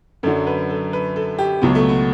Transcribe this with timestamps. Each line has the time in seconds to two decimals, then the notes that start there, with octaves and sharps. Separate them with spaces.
0.23 F#2 D3 F#3 A4
0.47 B4
0.70 A4
0.93 B4
1.16 A4
1.39 G4
1.62 C#2 B2 F#3 B3
1.75 A3
1.89 B3